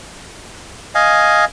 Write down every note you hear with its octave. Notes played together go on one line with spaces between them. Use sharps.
D#5 F5 G#5